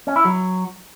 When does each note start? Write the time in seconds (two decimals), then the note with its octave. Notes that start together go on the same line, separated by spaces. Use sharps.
0.07 C#4
0.16 E4
0.25 F#3